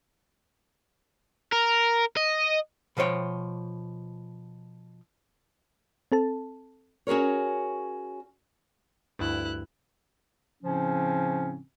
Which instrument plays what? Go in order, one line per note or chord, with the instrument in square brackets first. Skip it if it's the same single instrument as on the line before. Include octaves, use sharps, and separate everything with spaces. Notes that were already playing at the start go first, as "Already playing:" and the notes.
[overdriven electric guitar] A#4
D#5
[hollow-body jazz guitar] B2 F3 C5 C#5 G5
[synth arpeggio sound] C4 A4 A5
[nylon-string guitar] C#4 F#4 G#4 A#4 C#5
[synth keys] D2 G2 [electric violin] E4 F#6
[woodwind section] A2 C#3 F3 C4 C#4